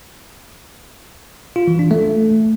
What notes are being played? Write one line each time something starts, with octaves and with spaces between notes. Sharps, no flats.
F4
E3
D4
A3